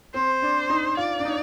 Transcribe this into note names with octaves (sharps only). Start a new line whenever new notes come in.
C4 C5
D4
D#4
F4 D5
D4
D#4